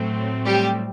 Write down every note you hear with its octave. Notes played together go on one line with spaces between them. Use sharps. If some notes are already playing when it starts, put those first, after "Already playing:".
Already playing: A2 F#3 A3 C4
G3 G4